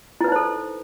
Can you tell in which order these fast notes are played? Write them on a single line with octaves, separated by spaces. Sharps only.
E4 B4 D#4 C5 A4